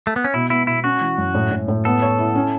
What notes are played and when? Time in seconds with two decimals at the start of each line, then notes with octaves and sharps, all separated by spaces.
0.07 A3
0.16 B3
0.24 C#4
0.34 B2 E4
0.50 B3 E4
0.67 B2 E4
0.84 C#4 F#4
1.01 E3
1.18 F#2
1.35 A2
1.51 A2
1.68 A2
1.85 B3 A4
2.02 C#5
2.19 E4
2.35 C#4